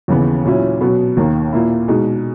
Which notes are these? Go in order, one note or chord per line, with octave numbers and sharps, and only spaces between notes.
D#2 C#3 E3 B3
A#2 F#3 C#4 E4
B2 F#3 B3
D#2 D#3 A#3
A#2 A#3 E4
B2 G#3 D#4